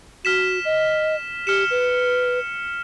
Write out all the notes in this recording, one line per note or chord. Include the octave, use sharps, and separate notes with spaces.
F#4 F6 B6 E7
D#5
G4 F6 C#7 E7
B4